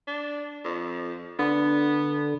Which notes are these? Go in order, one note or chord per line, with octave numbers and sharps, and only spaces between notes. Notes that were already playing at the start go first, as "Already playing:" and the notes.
D4
F2
D3 B3